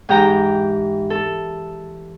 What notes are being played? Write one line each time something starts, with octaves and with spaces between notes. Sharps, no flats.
G#2 E3 G4 G5 A#5
A4